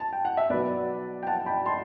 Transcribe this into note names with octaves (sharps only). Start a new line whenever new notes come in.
A5
G5
F#5
E5
B1 B2 F#3 B4 D5
G5
F#5 A5
G5 B5
A5 C6